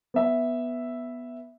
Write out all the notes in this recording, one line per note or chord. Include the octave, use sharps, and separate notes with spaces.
B3 E5